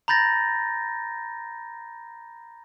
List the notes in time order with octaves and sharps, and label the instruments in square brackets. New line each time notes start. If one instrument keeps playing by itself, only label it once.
[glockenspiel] A#5 B5 G6 A6 A#6